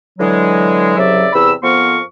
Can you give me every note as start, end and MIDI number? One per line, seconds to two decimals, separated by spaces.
0.19 0.96 50
0.19 0.96 52
0.19 0.96 54
0.19 0.96 56
0.97 1.28 36
0.97 1.28 49
0.97 1.28 54
0.97 1.28 74
0.97 1.28 76
1.33 1.53 40
1.33 1.53 48
1.33 1.53 83
1.33 1.53 88
1.62 2.00 41
1.62 2.00 53
1.62 2.00 59
1.62 2.00 70
1.62 2.00 84
1.62 2.00 85